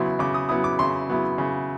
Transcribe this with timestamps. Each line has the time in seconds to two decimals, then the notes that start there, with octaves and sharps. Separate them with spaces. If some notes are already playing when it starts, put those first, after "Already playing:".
Already playing: C#3 F#3 B3 E4 C6
0.19 C#3 D6
0.34 D#6
0.49 F#3 B3 E4 D#6
0.64 D6
0.79 C#3 C6
1.09 F#3 B3 E4
1.38 C#3